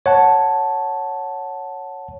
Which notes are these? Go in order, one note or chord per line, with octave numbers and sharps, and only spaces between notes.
C#5 F#5 A5